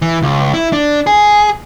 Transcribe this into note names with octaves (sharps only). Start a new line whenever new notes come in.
E3
C#2
E4
D4
G#4